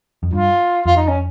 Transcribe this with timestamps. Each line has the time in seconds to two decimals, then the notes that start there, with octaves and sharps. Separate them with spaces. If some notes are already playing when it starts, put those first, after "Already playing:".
0.23 F2
0.33 G2 F4
0.86 F2 F4
0.96 D#4
1.08 C#4